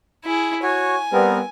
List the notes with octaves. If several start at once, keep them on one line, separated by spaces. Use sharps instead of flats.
E4 G#4
F#4 C#5 G#5
G3 B3 C4 A#4